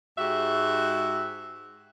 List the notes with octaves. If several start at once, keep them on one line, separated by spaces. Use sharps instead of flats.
G#2 F#4 G4 E5